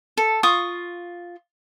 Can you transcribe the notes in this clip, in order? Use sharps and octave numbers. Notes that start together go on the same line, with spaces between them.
A4
F4 C#6 D#6